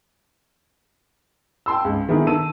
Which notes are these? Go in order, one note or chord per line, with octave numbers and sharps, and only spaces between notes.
G5 A5 C6 E6
C#2 G#2
D3 D#3 B3 E4 G#4 A#4
D#3 A5 E6 D#7